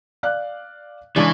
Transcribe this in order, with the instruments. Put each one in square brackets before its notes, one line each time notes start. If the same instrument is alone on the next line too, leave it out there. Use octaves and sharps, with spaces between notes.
[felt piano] D5 F5 F#6
[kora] C#3 G#3 C#4 [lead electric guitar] E3 [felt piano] D4 [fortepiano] D5